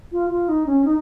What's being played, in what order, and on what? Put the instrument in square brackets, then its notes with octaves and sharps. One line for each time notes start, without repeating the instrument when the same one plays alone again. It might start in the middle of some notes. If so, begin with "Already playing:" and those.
[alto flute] F4
F4
D#4
C#4
D#4